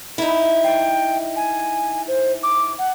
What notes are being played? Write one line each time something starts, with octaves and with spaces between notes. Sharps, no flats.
D#4 E4
G5
G#5
C5
D6
F#5